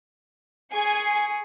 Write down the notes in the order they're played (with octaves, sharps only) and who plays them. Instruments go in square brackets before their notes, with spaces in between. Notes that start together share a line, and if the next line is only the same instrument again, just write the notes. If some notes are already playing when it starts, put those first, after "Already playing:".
[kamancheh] G#4 C#6 [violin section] G#5 C7